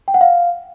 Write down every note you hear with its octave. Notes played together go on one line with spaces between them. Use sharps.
G5
F#5
F5